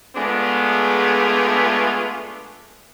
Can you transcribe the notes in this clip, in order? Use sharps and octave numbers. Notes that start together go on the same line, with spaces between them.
G#3 A3 B3 D4 F4 G#4